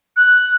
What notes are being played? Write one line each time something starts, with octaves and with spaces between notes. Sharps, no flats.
F#6